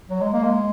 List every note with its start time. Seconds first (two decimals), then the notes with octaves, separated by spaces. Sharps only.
0.10 F#3
0.21 G#3
0.33 A#3
0.44 G#3